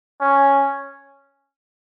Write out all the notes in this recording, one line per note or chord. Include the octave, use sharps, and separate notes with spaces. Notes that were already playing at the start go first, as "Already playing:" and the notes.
C#4